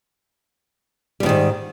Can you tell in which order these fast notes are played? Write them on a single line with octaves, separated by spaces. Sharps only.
G3 E2 D#3 G#2